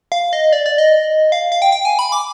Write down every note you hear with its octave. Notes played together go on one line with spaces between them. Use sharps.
F5
D#5
D5
D5
D#5
F5
F5
G5
G5
G#5
B5
D6